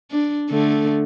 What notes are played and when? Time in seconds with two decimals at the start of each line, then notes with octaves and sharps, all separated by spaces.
0.11 D4
0.50 D3 A3